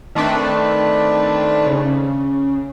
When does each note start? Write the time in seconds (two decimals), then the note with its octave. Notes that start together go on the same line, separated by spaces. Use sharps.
0.15 D#3 A3 C4 D4 B4
1.66 C#3